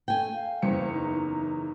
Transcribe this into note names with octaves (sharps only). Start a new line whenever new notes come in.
A3 G5 G#5
F5
F#1 E2 C5 C#7
D#4